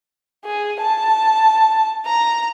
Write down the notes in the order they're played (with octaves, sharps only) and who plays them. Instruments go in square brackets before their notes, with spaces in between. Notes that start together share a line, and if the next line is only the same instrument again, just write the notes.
[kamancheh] G#4
A5
A#5